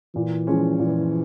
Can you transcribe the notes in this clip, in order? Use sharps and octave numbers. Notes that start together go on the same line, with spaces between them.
A#2 E3
F3 G#3 C#4
A#2 E3